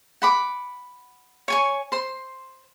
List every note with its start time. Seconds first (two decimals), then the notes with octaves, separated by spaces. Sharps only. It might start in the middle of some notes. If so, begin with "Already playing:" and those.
0.22 F#5 B5 D6
1.48 C#5 G#5 C#6
1.92 C5 C6